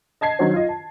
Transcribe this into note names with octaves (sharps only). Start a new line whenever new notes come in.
D#5 A5 G#6 C7
D#3 F#3 D#4 F#4 C5 C#5
F4 D#5
A5